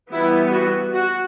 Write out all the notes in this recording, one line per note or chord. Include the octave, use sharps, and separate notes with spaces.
E3 G3 B3 E4
F#4
F#4